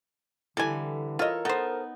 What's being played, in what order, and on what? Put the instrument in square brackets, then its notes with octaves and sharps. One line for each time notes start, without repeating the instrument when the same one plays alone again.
[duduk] D3 [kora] E3 G3 [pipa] A4 G#5
[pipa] F4 D#5 [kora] A4 C#5 [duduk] A#4
[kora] B3 D#4 [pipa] A4 C5